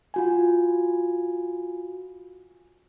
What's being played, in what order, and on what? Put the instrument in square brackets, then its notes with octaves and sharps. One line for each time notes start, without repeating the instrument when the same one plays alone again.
[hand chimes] F4 F#4 G#5